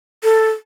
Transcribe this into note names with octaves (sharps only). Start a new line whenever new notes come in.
A4